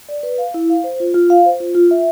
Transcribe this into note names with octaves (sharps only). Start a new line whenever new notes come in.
D5
B4
F5
E4
F5
C5
F4
F4
F5
C5
F4
F4
E5